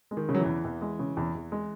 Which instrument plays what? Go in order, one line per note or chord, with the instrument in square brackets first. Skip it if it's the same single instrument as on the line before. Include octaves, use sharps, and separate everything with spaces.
[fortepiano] G#3
[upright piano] D#3
[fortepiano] C#3
[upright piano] F#3
E3
[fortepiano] E2
E2
G#3
C#3
E2
E2
G#3